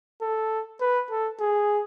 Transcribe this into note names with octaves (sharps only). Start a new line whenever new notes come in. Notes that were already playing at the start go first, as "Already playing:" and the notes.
A4
B4
A4
G#4